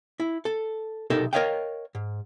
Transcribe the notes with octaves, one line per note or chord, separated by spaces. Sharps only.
E4
A4
B1 C3 D#4 A4 A#4 E5
A#4 B4 C#5 D#5 F5 G5
G#2